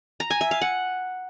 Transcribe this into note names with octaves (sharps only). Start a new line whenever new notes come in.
A#5
G#5
E5
F5
F#5